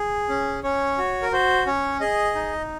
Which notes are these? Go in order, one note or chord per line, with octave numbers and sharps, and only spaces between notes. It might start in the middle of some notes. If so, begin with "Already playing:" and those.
Already playing: G#4
C#4
C#4 C#5
F#4
A#4
F#4 C5
C#4 C#5
G#4 D#5
D#4